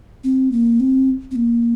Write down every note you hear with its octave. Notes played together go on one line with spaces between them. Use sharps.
C4
A#3
C4
C4
A#3